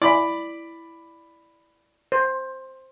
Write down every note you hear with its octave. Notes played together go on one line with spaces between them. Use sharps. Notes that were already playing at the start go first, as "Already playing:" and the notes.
E4 D5 B5
C5